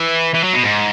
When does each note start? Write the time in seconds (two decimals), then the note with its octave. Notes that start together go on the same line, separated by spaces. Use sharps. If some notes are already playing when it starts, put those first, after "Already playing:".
Already playing: E3
0.34 E3
0.44 F#3
0.54 B2
0.64 G#2